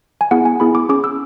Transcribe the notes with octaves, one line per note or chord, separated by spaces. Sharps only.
G#5
B3 E4 G#4 F#5
G#5
B3 E4 G#4 B5
D6
C#4 G#4 D6
E6